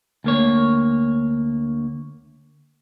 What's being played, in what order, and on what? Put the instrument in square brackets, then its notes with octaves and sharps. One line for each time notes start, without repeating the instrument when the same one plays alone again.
[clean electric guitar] D2 A#3 C#5